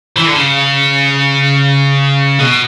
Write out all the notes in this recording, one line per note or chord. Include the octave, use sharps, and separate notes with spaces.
E3
D3
C#3
B2